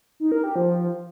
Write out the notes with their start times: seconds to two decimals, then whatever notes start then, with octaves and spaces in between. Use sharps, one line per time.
0.20 D#4
0.32 A#4
0.44 G4
0.55 F3